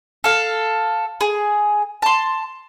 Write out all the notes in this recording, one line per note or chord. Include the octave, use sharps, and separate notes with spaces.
A4 F5
G#4
A5 C6